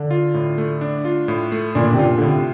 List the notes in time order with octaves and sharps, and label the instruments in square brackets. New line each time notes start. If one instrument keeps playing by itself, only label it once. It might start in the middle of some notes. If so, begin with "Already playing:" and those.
Already playing: [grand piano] D3 [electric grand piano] D4
[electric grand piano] F4
A2
A3
D4
F4
A2
A3
[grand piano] A#2 [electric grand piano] D4
[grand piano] C3
[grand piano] A#2 [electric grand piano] F4
[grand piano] D3
[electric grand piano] A2 [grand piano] C3